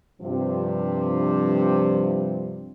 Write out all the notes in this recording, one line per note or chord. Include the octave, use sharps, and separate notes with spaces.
G2 C3 F3